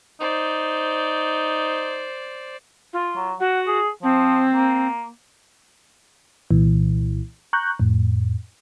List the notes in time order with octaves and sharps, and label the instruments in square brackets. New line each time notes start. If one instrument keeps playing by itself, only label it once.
[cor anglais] D#4 [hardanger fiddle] C5 D5
[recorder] F4
[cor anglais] F#3
[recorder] F#4 [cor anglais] F#5
[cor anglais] G#4
[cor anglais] F3 [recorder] C4
[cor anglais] A#3
[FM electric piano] C2 A#2 E3
A#5 C#6 F#6 G6
F2 A2